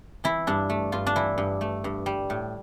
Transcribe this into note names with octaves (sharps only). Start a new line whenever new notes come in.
E3 E4
G2 D4
A3
G2 F4
D4
E3 E4
G2
A3
G2
G3
A2